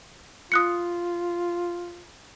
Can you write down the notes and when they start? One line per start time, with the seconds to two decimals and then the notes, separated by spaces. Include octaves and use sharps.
0.52 F4 D#6 F#6 C#7